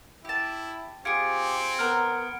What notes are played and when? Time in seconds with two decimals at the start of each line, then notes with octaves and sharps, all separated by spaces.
0.25 E4 G4 A5
1.05 C4 F4 G4 G#4 G#6 C#7 D7
1.79 B3 A#4 F#5 F6